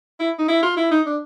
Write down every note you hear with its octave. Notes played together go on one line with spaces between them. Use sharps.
E4
D#4
E4
F4
E4
D#4
D4